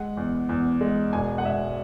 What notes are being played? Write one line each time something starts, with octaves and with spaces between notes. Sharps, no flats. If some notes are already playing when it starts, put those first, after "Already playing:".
Already playing: G#3 F#5
E2
E2
G#3
E1 G#5
F#5
E1 E5